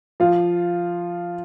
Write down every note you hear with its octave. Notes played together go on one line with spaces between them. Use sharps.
F3 F4